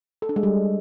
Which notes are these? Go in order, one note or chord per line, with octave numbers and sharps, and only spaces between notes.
A4
D4
G#3
G3